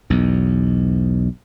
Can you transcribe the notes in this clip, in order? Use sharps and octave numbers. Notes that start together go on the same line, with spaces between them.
B1 E2